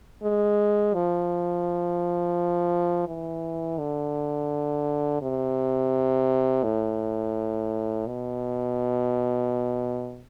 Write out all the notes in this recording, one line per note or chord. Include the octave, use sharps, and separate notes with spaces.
G#3
F3
E3
D3
C3
A2
B2